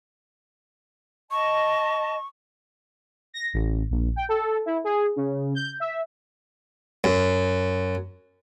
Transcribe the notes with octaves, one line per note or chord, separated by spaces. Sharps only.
D#5 A5 C#6
A#6
A1
A#1
G5
A4
E4
G#4
C#3
G6
E5
F#2